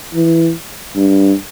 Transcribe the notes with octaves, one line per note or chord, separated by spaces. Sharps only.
E3
G2